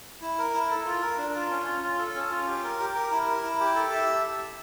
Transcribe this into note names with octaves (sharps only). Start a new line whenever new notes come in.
E4
A#4
E4
A4
F4
A#4
D4
F4
C#4
F4
F4
A4
C#4
F4
G4
A#4
G4
A#4
E4
A#4
E4
G4
A4
E5